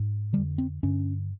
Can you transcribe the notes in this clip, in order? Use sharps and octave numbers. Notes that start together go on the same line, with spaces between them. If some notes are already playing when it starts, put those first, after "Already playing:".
Already playing: G#2
F2 D3 G3
C4
G2 D3 C#4